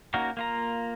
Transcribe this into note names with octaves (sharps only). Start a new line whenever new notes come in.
A#3 C#4 D#4 F#4 A#4
A#3 F4 A#5